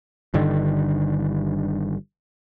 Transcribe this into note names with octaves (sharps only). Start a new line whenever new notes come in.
G1 G2 D3 D#3